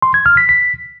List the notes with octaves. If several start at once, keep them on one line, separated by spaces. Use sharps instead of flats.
C6
G#6
F6
B6
B6